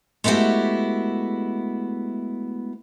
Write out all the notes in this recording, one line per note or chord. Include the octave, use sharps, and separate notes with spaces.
G#3 A3 B3 E4 F#4 G4